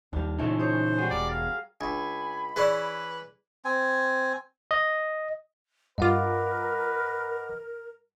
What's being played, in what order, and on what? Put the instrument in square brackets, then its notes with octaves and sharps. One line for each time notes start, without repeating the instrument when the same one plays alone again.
[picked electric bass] D#2 G3 [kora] D4 F5
[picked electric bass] A#2 C#3 E3 [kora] G#3 A3 [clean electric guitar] D#4 E4 A4
[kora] G#4 C#5 [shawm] C5
[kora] G3 G#3 F#4 [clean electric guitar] G#4
[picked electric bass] E1 [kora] A#4 [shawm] D5
[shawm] F5
[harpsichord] C#2 [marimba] D4 [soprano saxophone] G#5 [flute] B5
[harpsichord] E3 C#4 E4 [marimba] G#4 D5 [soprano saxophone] B4
[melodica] C4 G#5
[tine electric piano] D#5
[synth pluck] G2 F4 [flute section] A#4 [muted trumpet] B4 [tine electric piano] D#5 F#5 D6